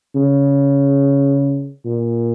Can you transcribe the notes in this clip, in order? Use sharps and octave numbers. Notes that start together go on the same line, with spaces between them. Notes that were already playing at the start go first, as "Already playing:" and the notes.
C#3
A#2